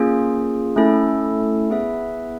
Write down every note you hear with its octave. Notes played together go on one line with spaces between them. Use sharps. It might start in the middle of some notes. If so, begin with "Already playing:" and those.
Already playing: A#3 C#4 F4 G#4
A3 C#4 E4 A4
B3 E4 G#4 B4 E5